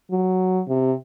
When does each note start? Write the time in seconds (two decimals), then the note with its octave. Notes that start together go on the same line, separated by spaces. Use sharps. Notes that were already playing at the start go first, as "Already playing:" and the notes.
0.10 F#3
0.68 C3